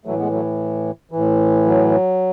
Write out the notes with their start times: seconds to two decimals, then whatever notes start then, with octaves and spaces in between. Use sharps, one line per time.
0.05 A2 E3 F#3 A3
0.19 G#3 B3
0.32 F#3 A3
1.11 A2 E3
1.66 F#3